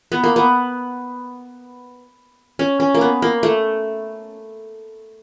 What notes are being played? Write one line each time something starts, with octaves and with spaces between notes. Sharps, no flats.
B3
A#3
B3
C#4
C#4
A#3
B3
A#3
A3